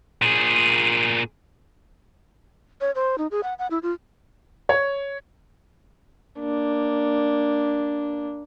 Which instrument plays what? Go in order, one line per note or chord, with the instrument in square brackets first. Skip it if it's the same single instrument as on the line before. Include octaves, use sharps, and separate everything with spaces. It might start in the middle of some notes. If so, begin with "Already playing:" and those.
[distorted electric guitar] A#2 G#4
[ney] C#5
C5
D#4
G#4
F#5
F#5
E4
F4
[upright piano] C#5
[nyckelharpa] A#3 D4